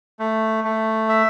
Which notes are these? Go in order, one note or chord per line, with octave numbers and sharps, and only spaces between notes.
A3
A3
E5